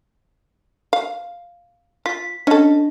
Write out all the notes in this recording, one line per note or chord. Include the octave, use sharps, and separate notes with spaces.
F5
F4 B6
C#4 D4 A4 D#5